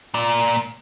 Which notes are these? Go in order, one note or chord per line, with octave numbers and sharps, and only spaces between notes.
A#2 D5